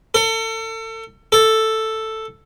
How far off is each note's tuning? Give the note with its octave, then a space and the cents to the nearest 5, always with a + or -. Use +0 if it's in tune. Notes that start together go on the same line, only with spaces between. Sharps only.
A4 +35
A4 +5